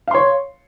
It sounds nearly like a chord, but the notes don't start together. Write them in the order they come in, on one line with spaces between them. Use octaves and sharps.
F5 C6 C#5